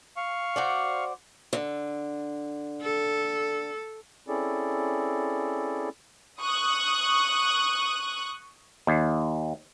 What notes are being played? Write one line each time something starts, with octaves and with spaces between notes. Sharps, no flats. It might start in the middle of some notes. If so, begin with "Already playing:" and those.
F5 C#6
F#4 C5 D5
D3
A4
C4 C#4 E4 G#4 A4 D5
C#6 D#6 F#6
D#2